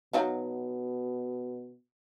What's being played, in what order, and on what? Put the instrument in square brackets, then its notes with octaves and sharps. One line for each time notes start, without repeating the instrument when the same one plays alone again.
[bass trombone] B2 [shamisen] F#3 D#4 F5